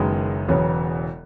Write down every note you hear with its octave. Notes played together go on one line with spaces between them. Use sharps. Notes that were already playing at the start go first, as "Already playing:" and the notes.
Already playing: F#1 F#2 D#3 G#3 B3
E1 E2 C#3 F#3 B3